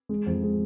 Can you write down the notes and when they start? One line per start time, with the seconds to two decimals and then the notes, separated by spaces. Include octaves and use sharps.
0.09 G#3
0.26 F2
0.43 G#3